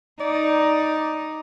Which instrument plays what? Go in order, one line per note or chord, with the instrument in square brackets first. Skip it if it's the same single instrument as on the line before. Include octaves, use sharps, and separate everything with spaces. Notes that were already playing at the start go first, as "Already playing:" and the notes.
[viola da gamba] D#4 [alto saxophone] D5